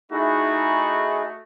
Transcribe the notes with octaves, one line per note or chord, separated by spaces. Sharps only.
A3 D#4 E4 F#4 G#4